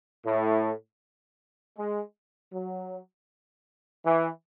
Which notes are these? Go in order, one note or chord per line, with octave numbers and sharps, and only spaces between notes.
A2
G#3
F#3
E3